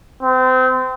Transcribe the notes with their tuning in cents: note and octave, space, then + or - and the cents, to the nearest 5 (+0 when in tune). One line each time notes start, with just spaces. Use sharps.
C4 -30